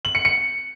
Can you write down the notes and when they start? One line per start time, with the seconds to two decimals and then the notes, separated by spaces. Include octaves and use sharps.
0.05 F#7
0.15 C#7
0.25 C#7